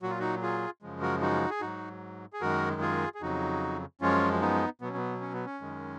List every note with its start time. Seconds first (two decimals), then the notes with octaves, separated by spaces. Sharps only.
0.02 A#2 F#3 F#4
0.10 F4
0.20 D#4 F#4
0.42 F4 G#4
0.82 F#2 C#3 F3 G#3
1.02 F#4 A#4
1.21 D#4 F#4
1.50 G#4
1.61 G#2 F#3 D#4 F#4
2.33 G#4
2.41 F#2 D#3 G#3 F#4 A#4
2.81 F4 G#4
3.15 G#4
3.21 F2 C#3 F#3 D#4 F#4
4.01 F#2 F3 G#3 C#4 F4
4.41 B3 D#4
4.81 B2 F#3 B3
4.89 C#4
4.97 B3
5.21 C#4
5.34 B3
5.45 C#4
5.61 F#2 D#3 G#3